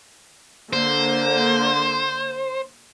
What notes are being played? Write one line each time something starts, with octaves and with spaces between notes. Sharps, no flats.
D3 A#3 C5